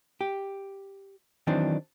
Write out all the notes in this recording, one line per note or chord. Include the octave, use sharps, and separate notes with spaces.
G4
D#3 E3 F#3 C4 D4